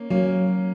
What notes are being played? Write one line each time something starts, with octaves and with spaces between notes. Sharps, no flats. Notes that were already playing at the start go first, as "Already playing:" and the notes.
Already playing: A#3 C#4
F#3 A#3 C#4